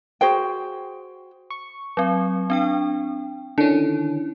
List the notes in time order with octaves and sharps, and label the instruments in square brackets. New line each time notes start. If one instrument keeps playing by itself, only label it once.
[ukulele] F#4 G#4 C5 G5
[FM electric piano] C#6
[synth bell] F#3 C4
C4 D4 G5
[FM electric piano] D3 D#3 C#4 [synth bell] E4